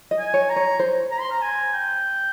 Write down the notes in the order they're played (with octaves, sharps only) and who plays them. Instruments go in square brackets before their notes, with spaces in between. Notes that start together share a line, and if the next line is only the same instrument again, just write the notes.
[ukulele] D#5
[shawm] G#5
[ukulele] C#5
[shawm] A#5
[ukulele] C#5
C5
[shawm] A#5
C6
A#5
G#5
G5